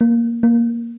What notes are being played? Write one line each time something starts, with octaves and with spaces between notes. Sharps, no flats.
A#3
A#3